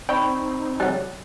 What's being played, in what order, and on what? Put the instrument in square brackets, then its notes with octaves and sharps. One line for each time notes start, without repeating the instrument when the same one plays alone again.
[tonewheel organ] C4 D#4 [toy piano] D5 B5 C#6 [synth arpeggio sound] G5
[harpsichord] F#3 G3